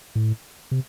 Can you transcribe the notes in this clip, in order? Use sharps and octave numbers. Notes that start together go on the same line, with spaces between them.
A2
C3